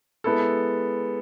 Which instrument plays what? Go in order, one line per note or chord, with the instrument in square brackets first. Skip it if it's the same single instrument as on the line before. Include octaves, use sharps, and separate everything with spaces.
[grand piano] G#3 B3 E4 A4